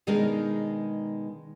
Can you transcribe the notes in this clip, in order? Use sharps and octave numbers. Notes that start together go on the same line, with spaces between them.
B2 D#3 G#3 D4 D#4 A#4